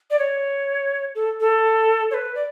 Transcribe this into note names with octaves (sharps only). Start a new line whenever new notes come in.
D5
C#5
A4
A4
C#5
B4
D5